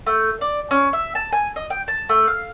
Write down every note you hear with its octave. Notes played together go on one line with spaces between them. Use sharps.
A3
D5
C#4
E5
A5
G#5
D#5
G5
A5
A3
F5